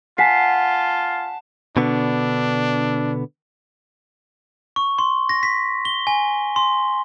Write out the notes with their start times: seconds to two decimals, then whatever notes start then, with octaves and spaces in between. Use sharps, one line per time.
0.18 F4 F#5 G#5 A5 B6 C7
1.77 B2 D3 B3 D4
4.76 C#6
4.98 C6
5.29 A#6
5.43 B6
5.85 G7
6.07 G#5
6.56 C6